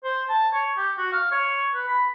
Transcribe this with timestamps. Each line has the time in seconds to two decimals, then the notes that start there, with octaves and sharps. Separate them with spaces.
0.04 C5
0.29 A5
0.54 C#5
0.77 G4
0.98 F#4
1.12 F5
1.32 C#5
1.74 B4
1.87 B5